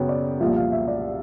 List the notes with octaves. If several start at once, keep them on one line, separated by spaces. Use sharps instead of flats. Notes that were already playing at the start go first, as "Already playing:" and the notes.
Already playing: F#2 C#3 F#3 B3 C#5 G5
D5
C2 A#2 F3 E5
F5
E5
D5